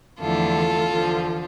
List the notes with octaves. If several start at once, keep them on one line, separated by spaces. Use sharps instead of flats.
E2 D3 F3 A3 E4 F4 A4
E2 D3 F3